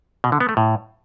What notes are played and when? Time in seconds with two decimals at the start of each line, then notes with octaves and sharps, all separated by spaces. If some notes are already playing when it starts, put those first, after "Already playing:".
0.24 B2
0.32 D3
0.40 B3
0.49 A3
0.57 A2